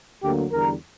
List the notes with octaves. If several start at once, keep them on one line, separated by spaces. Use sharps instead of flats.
D2 D3 F#3 A#3 G4
E2 D3 G3 A#4